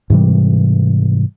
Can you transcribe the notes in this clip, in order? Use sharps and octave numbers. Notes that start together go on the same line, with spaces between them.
G#2 C3 E3 G3